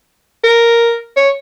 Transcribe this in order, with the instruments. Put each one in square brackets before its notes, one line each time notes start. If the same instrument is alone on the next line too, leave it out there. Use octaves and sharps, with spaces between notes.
[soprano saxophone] A#4
C#5